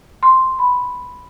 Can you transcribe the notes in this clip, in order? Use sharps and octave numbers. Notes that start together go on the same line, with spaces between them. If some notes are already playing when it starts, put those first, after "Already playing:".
C6
B5